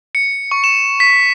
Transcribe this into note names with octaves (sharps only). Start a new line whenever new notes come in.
C#7
C#6
E7
B6